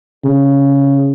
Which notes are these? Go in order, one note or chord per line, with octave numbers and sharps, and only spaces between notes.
C#3